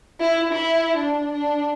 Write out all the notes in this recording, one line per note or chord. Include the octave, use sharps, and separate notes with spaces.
E4
E4
D4
D4